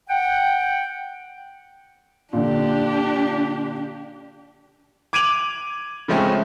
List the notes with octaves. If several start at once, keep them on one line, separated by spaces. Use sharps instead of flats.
F#5 G5
A#2 D3 D4 G4
D6 G#6 D7 D#7 F7 F#7
C#3 F3 G#3 A3 C4 C#4